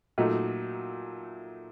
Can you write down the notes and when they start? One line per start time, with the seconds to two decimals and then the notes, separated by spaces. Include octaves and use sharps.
0.18 A#2 F#3 A3 D#4 F#4